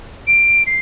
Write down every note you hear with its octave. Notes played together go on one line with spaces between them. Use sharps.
D7
C7